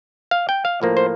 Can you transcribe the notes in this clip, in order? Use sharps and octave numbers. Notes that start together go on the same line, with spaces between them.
F5
G5
F5
A2 F3 A#3
C5